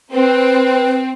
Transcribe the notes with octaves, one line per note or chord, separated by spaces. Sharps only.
C4 B4